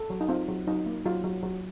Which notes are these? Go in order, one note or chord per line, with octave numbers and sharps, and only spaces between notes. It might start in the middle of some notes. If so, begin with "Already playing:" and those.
Already playing: A4
F#3
D#4
C4 F4
F#3
F#3 D#4
A#3
F#3 F4
F#3
F#3